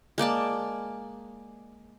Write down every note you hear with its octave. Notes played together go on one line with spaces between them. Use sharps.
G#3 A#3 D5 A5